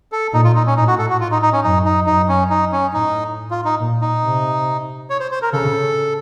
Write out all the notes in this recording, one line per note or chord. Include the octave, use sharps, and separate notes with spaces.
A4
A#2 D#4
F4
D#4
C#4
A2 D#4
F#4
A4
F#4
F4
D#4
D#4
C#4
F#2 D#4
D#4
F#2 D#4
C#4
D#4
C#4
A2 D#4
F4
D#4
A#2
D#4
C3
C#5
C5
C5
A#4
C#3 A4